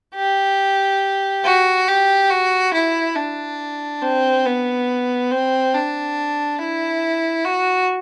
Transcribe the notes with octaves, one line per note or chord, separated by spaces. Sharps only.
G4
F#4
G4
F#4
E4
D4
C4
B3
C4
D4
E4
F#4